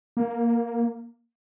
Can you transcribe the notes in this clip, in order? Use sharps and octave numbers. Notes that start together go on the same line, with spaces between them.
A#3